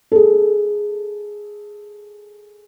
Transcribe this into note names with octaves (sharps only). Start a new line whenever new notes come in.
G#4 A4